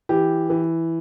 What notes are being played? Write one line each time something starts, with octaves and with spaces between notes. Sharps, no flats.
E3 G4
E3